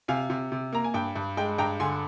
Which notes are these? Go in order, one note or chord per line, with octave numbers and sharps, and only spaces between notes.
C3 F5 G#5
C3
C3
A#3 A#5
G#5
G2 G5
G2
G#3 G5
G2 G5 A#5
D3 G#5 C6